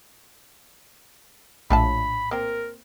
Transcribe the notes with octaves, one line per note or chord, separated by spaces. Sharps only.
A#1 A2 D4 F4 A5 B5
A#3 C4 A#4